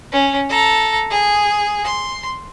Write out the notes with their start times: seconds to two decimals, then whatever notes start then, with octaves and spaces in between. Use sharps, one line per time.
0.12 C#4
0.49 A4 A#5
1.10 G#4
1.84 C6